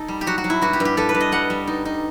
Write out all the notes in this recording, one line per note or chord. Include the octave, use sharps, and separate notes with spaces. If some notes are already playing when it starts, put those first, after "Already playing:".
Already playing: D#4 A4
G3
G4
F#3 F#4
F#4
F#3
E4
G2 F#4
G4
G2
G4
G2 A4
B4
G2
D#5
G3 F#5
G3
D#4
D#4